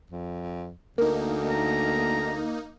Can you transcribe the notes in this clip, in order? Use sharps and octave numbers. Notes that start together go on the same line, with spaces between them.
F2
D2 A#3 D#4 A#4
A#5